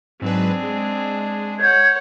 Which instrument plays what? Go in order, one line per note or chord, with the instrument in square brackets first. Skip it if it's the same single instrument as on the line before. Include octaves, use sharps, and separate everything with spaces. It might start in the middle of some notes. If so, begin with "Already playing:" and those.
[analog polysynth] G#2 F#3 B4 [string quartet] C4 D4 G#4
[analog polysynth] G#3
[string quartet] C#5 F#5 [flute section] G6 G#6